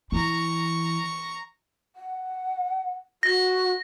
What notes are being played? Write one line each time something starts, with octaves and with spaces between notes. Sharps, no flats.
E3 A#5 C#6
F#5
F#4 A#6